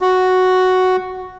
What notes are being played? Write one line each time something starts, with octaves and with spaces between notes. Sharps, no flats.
F#4